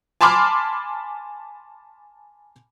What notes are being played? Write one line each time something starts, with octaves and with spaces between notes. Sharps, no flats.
G#5 A5 B5 C6 D6 F6